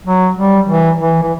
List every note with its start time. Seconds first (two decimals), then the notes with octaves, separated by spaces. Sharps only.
0.06 F#3
0.37 G3
0.68 E3
1.00 E3
1.22 E3